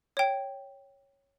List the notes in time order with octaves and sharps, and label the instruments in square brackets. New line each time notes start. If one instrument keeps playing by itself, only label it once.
[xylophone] C#5 G5